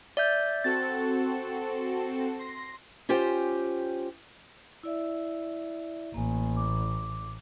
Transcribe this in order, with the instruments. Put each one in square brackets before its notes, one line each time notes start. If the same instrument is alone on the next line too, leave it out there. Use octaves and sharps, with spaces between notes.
[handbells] D5 E5 G6
[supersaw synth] C4 F#4 A4 [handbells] A6
[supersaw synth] C6 A#6
[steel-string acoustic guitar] C#4 F4 G4 C5 G5
[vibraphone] E4 D5 E5
[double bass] A1 [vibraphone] A#3 G#5
[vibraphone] D6